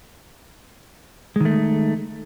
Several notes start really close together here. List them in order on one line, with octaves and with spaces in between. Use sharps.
G#3 D#3 A3